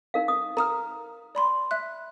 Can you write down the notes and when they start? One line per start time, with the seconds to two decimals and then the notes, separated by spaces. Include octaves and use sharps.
0.14 D#4 A#4 F5
0.28 D#6
0.57 A#4 A#5 D#6 F6
1.35 D5 B5 C6
1.71 E5 F#6